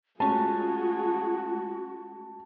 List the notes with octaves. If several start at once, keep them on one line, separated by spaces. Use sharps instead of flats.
G#3 A3 C#4 F4 F#4 G#4 A5